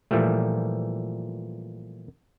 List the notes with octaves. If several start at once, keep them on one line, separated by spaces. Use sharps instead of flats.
A#2 E3 F3 G3 A3